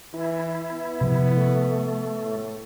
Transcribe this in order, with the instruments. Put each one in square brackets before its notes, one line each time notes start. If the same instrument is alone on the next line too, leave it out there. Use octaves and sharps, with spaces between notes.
[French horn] E3 [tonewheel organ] E4
[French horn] B3
[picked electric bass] C3 F3
[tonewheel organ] A3
[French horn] A2